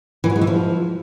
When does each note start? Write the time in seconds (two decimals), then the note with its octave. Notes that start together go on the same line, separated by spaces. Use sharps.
0.24 E3
0.30 F#3
0.36 G#3
0.41 E3
0.47 F3